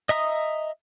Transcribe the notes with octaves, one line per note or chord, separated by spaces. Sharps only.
D#5 E5 A#5 D#6